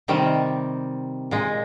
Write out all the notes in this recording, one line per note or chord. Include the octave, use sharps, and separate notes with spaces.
C3 D#3 G3
A#2 G#3